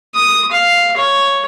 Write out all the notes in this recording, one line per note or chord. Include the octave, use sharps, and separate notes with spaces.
D#6
F5
C#5